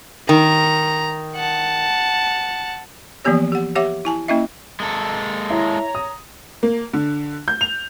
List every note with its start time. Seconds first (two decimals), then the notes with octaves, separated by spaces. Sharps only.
0.29 D#3 A#5
1.36 F#5 A5
3.25 E3 F3 A#3 B3 G4 C#5
3.52 G4 F#5
3.75 G4 C#5 E5 F#5 D6
4.05 E4 G#5 A5
4.28 A#3 C#4 E4 D#5 E5
4.80 G#3 A#3 A4
5.50 E4 C#5 A#5
5.95 D#6
6.63 A#3
6.93 D3
7.48 G6
7.61 F7